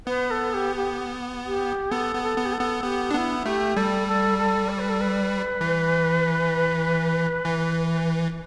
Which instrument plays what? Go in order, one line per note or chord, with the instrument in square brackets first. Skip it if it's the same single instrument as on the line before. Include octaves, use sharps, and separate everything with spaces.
[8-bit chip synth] B3 [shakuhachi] B4
[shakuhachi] A4
G4
G4
G4
[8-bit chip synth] B3 [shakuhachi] A4
[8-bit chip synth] B3
[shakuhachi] A4
[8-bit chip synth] B3
[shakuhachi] G4
A4
[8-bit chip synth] B3
[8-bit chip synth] B3 [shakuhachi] G4
[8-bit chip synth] D4
[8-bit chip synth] B3 [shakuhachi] E4
[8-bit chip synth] A3 [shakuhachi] G4
[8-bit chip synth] G3 [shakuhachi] A4
[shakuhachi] A4
A4
D5
B4
A4
B4
[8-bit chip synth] E3
E3